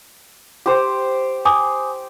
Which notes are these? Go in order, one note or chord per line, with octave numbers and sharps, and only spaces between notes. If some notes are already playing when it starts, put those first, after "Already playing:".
G4 C5
G#5 D6 D#6